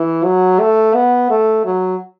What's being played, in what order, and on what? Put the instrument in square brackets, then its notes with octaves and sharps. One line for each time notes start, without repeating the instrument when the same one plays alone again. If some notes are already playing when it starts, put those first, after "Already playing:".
Already playing: [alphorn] E3
F#3
A3
B3
A3
F#3